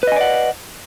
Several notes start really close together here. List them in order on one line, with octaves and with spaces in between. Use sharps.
B4 D#5 G#5 D5 F#5